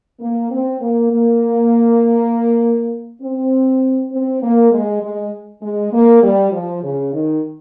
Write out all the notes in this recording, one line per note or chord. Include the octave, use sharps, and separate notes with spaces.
A#3
C4
A#3
A#3
C4
C4
A#3
G#3
G#3
G#3
A#3
G3
F3
C#3
D#3